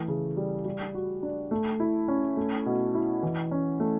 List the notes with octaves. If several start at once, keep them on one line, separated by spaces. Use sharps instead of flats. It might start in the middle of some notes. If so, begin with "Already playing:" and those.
Already playing: E3 A3
C#3
G3
G3
F#4
D4
A3
E4
C#4
A3
B2
E4
E3
C#4
A3